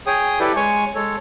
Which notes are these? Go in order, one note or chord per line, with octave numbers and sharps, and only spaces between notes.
G#4 C#5 G5 D#6
E4 G4 A4 B4 D5
G#3 C#5 G#5 C#6
G#3 A4 C#5